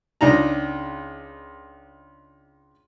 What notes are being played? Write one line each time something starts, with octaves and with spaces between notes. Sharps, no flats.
C#2 D4 D#4 A#5